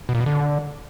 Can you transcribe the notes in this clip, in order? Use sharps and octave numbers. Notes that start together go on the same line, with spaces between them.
B2
A#2
B2
D3